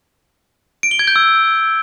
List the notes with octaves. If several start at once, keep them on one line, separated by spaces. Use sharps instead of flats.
D7
G7
G#6
G6
E6